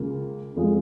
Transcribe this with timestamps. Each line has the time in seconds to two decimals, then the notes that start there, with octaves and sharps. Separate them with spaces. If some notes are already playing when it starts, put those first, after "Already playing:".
Already playing: C#2 C#3 A#3 F4
0.56 F2 F3 G#3 F4 G#4